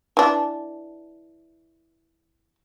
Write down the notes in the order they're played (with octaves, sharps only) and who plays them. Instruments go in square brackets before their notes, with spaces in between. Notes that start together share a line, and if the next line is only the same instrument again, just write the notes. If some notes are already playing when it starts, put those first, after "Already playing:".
[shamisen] E3 D4